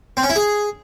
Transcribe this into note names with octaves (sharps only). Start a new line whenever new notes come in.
C4
C#4
E4
G#4